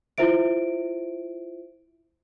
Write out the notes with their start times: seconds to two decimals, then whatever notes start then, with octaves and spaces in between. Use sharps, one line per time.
0.18 E4 F4 C5 E5 D7